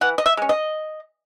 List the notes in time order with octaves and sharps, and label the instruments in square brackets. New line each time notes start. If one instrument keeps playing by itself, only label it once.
[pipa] E3 F#5
D#5
E5
G#3 C#4
D#5